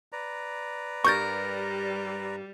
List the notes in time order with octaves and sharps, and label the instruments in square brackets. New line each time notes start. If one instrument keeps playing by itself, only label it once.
[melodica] B4 D5 A#5
[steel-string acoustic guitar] G2 A#4 [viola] G3 [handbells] C#6 G6 A6